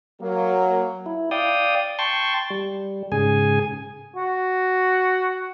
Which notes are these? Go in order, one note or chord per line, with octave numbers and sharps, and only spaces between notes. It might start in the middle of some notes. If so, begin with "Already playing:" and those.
F#3 A#3
E4
D5 F5 G5 D#6
G5 A5 C6 C#6
G3
G#2 C#3 G#4 G#5
F#4